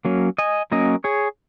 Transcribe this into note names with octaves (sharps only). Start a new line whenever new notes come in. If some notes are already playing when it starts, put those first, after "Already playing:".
F#3 A#3 C#4
D#5 G#5
F#3 A#3 C#4 A#4 D#5
G#4 C#5